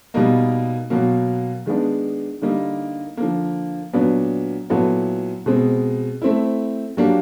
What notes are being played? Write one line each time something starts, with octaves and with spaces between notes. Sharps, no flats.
B2 G3 A#3 D#4
B2 F#3 A#3
D#3 G#3 B3 D4
D3 G3 A#3 D#4
D3 F3 A#3
A#2 F#3 B3 D4
A#2 F#3 B3 E4 A4
B2 G#3 C4
A3 C4 E4
F#3 A#3 D4 G4